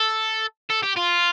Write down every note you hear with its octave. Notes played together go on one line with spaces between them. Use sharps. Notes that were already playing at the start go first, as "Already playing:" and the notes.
Already playing: A4
A4
G4
F4